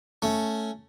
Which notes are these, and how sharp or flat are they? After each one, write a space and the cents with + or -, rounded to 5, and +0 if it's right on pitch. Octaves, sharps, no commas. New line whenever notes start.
A3 +0 C#4 +0